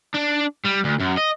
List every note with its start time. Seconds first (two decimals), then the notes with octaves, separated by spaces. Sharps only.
0.15 D4
0.65 G3
0.85 D2
1.00 F#2
1.18 D#5